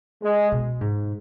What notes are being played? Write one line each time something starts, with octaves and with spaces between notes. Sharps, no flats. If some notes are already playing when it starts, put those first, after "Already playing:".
G#3
B2
G#2